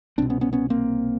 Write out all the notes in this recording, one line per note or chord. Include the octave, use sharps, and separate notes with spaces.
C2 B2 C4 D4
B3 C#4
B3 C#4
B3 C#4
A#3 C4